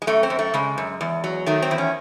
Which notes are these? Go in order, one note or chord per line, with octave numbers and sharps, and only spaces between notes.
G#3
F#2 A3
C4
F#2
A3
C#3 G#3
F#2
E2
F#3
D#3 A3
C4
E2
C#4